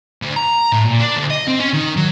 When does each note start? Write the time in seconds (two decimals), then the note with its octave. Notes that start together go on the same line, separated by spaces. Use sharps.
0.22 D2
0.36 A#5
0.72 A2
0.85 A#2
1.00 D4
1.17 D2
1.30 D#5
1.48 C4
1.60 C#4
1.73 D#3
1.97 F#3